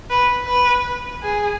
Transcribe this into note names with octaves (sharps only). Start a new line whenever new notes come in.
B4
B4
G#4